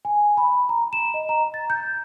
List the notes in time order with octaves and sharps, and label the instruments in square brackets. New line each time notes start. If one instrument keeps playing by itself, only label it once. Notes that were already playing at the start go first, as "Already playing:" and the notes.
[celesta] G#5
B5
A#5
E7
D#5
A#5
A6
G6